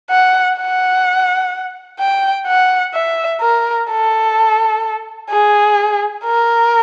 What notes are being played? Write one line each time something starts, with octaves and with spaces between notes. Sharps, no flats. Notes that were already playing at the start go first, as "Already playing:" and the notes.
F#5
F#5
G5
F#5
E5
A#4
A4
G#4
A#4